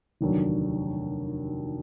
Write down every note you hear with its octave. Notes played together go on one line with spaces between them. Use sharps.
F1 D#2 D3 F#3